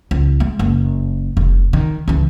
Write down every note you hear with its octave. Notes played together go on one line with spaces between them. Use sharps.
C#2
G#3
F#1
F1
D#3
C#2 E3